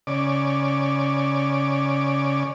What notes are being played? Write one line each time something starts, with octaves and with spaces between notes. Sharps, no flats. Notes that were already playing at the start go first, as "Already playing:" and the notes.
C#3 D5